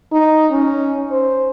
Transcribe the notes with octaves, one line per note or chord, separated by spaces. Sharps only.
D#4
C#4
C5